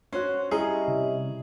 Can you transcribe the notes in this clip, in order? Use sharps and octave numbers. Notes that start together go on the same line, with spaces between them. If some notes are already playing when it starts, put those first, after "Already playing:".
C#4 F#4 C5
G3 C#4 E4 G#4 D#5 A#5
C3